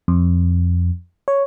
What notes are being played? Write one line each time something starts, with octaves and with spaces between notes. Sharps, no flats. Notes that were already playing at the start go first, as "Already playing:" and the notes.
F2
C#5